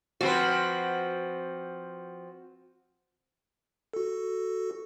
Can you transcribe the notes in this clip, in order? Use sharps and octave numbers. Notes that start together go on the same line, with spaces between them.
F3 C4 F#4 B4
F#4 A4